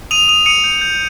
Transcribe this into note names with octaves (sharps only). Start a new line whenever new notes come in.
D#6 D#7 F7
D#6 D#7 F7
D#6 C#7 D#7
G6
G6